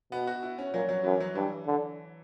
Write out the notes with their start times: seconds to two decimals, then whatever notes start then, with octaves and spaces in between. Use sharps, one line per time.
0.12 B2 B3
0.27 F#4
0.43 E4
0.58 C#4
0.73 A#2 F#3
0.89 F#3
1.04 F#2 E3
1.20 F#3
1.35 G2 E3
1.66 D3